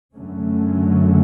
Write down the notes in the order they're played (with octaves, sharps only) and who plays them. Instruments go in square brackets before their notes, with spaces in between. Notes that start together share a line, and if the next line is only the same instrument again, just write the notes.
[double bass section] F#2 D3 F#3 A3 C#4